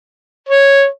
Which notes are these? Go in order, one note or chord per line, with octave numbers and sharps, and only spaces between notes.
C#5